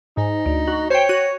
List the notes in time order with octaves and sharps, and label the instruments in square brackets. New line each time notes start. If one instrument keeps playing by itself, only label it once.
[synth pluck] G#2 [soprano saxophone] D#4
[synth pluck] D2
F#4
[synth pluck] C5 G5 [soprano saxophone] C#5
[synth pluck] F#4 D#7